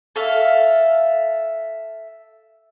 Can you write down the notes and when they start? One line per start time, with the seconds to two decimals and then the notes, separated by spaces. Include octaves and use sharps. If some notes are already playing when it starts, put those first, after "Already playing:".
0.16 A4 E5 F5